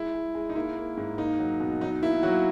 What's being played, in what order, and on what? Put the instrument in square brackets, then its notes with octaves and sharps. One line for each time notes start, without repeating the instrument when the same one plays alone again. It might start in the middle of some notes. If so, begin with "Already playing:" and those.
Already playing: [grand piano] G#3 E4
G#3
G#3
D#4
A#3 E4
A#3
G#2
A#3 D#4
F#3
B2
F#3 D#4
A#3 E4
F#3 A#3 F#4